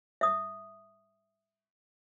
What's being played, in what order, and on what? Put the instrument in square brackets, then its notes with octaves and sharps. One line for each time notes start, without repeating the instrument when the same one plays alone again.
[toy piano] E5 D#6